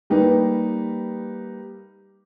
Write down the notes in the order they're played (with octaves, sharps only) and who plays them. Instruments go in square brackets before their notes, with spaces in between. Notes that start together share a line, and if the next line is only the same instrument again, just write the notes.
[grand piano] G3 A#3 D#4 G4 B4